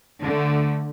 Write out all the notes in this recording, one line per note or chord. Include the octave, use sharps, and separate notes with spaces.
D3 A3